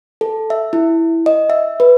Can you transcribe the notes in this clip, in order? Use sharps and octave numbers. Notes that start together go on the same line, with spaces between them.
A4
E5
E4
D#5
E5
B4